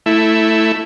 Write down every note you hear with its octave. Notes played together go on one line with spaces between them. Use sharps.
A3 E4